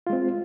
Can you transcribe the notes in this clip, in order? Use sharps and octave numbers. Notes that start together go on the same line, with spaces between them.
G#3 C4 F4